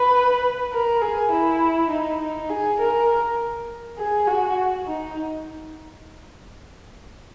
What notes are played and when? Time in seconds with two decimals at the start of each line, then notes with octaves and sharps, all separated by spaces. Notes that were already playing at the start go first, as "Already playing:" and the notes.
Already playing: B4
0.73 A#4
1.02 G#4
1.32 E4
1.91 D#4
2.21 D#4
2.50 G#4
2.80 A#4
3.98 G#4
4.27 F#4
4.87 D#4